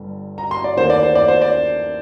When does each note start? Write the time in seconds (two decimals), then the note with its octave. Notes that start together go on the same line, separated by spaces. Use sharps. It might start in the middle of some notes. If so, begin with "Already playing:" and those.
Already playing: G1 G2
0.38 A#5
0.51 C6
0.64 D5
0.76 D#2 D#3 A3 C5
0.90 D5
1.03 C5
1.15 D5
1.28 C5
1.42 D5